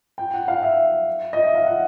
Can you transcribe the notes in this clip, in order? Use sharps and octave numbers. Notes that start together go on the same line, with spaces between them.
G5
F#5
F5
E5
D#5
E5
F5
F#5